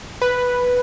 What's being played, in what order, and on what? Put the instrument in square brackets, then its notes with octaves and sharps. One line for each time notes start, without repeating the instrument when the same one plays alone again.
[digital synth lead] B4